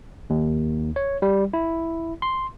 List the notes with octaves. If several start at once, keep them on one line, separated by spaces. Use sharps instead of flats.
D#2
C#5
G3
E4
C6